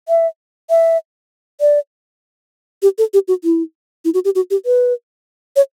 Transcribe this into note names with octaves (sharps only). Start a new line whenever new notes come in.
E5
E5
D5
G4
A4
G4
F#4
E4
E4
F#4
G4
F#4
G4
B4
C#5